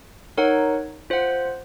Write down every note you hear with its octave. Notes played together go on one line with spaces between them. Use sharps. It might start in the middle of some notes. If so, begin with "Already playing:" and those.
D#4 A#4 C#5 F#5
F4 C5 F#5